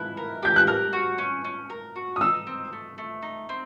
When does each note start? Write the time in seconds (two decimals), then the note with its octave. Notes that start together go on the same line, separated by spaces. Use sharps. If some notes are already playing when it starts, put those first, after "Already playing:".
Already playing: E4 F#6
0.17 A#4
0.43 G4 G6
0.56 F#6
0.67 A#4 F6
0.93 F#4
1.18 C#4
1.44 C#4
1.70 A#4
1.96 F#4
2.16 D#6
2.21 D#4 E6
2.47 C4
2.73 A3
2.98 A3
3.22 D#4
3.49 C4